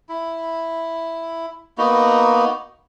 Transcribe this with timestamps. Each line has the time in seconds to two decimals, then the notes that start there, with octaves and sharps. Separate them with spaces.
0.09 E4
1.78 A#3 B3 D#4 F#4